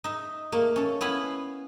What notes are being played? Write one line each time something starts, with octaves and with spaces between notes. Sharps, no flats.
D#4 E5
A3 A#3
C#4 A4
B3 E4 F5 G#5 B5